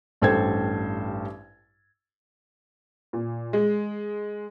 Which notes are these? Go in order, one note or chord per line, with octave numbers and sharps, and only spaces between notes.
A1 G2 A4 C5 G5 G#6
A#2
G#3